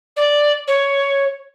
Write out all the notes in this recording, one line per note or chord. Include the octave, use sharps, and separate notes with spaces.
D5
C#5